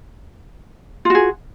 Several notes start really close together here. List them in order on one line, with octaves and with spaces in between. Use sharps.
F4 F#4 G#4